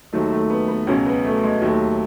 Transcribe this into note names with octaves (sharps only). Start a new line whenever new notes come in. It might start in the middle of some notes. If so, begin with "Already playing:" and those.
D#2 D#3 F#3 A3
A3
B3
B3
C#2 B2 F#3 C#4
B3
A3
G#3
D#2 D#3 F#3 A3